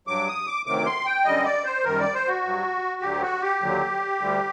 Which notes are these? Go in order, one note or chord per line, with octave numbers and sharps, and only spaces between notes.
G2 F#3 D6
D#6
D6
D2 C3 D#3 F#3 D6
C6
G5
F#2 D3 G3 D#5
D5
C5
F#2 D#3 G3 A#4
D5
C5
F#4
G2 F#3
D2 D3 F#3 G4
F#4
G4
D#2 D3 F#3
D2 D3 G3